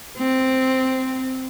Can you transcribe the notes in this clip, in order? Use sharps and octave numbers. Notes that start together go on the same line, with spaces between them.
C4